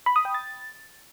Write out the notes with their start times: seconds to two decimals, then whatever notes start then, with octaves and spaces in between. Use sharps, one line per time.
0.06 B5
0.16 D#6
0.25 G5
0.34 A6